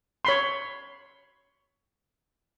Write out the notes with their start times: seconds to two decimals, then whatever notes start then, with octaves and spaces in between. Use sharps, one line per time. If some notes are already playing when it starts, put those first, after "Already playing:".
0.25 C#5 B5 C6